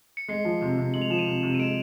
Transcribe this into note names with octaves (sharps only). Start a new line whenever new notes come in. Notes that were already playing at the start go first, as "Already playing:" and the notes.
C#7
G#3 C7
F3
C3
C3
G#3 F#7
F7
F3 E7
D#7 F7
C3
C3
D#7
G#3 D7 E7